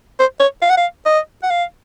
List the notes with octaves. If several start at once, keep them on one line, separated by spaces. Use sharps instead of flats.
C5
C#5
F5
F#5
F5
D#5
F#5
F5